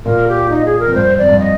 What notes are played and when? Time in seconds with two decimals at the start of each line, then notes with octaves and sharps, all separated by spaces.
0.06 A#2 A#4
0.28 G4
0.50 D#4
0.65 G#4
0.79 A#4
0.86 F2
0.94 G2 C5
1.17 F2 D5
1.29 G2
1.39 D#5